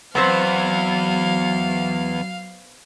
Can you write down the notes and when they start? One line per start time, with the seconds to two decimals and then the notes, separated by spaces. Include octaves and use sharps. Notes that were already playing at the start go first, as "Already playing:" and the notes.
0.15 E2 F#3 B3 C4 C5 F5